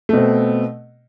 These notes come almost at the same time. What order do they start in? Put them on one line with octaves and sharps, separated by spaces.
A3 B2 C4